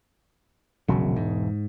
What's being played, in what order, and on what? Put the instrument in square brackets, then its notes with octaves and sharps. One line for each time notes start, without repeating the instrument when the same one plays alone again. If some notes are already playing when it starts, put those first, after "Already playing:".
[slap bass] E1 [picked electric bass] A#1 C#3 F#3
[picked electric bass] G#2